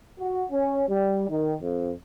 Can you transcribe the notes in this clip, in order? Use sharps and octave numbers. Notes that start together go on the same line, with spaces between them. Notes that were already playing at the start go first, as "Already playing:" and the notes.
F#4
C#4
G3
D#3
F2